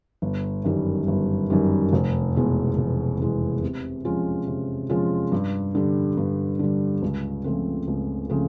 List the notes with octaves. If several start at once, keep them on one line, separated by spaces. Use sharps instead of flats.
G1
F#2 D#3 G3
G1
F#2 D#3 G3
F1
E2 B2 G#3
F1
E2 B2 G#3
C3
F3 G#3 C#4 F4
C3
F3 G#3 C#4 F4
G2
D3 G3
G2
D3 G3
C#2
C#3 F3 A3 C4
C#2
C#3 F3 A3 C4